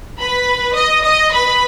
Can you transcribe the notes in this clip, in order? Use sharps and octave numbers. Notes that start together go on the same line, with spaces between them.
B4 B5
D#5 D#6
D#5 D#6
B4 B5